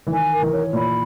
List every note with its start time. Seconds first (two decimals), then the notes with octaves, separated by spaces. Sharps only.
0.07 E3
0.12 D#3 G#5
0.32 A#4
0.42 E3
0.52 C#5
0.73 A#2 B5